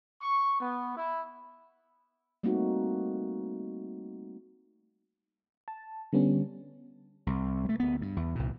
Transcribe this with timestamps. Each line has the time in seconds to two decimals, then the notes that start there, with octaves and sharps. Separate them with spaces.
0.22 C#6
0.60 B3
0.97 E4
2.43 G3 A3 A#3 C4 D#4 F#4
5.68 A5
6.13 D3 G3 B3 C#4
7.27 C2
7.65 G3 A3
7.80 D2 B3
8.01 G2
8.17 E2
8.35 C2 A#2